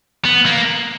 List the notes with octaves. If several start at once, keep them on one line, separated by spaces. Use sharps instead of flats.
B3
A#3